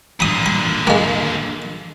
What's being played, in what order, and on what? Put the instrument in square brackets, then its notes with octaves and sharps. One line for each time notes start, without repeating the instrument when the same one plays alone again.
[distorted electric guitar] A#2 D3 [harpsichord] B5 D#6
[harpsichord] B5
G#3 A#3